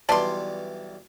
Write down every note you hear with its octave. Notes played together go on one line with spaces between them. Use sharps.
B1 E3 G3 D5 A5 C6